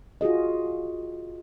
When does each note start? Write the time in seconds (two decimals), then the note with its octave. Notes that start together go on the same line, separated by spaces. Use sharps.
0.21 F4 F#4 G#4 D#5